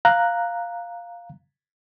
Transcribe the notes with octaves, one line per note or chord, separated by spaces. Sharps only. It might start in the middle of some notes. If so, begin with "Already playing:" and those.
F5 A#5 F#6